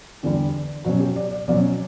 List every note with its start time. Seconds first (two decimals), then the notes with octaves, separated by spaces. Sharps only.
0.23 E2 D3 G3
0.85 B2 F#3 C#4 F#4
1.00 G4
1.16 D5
1.31 D5
1.48 B2 F#3 C#4 D5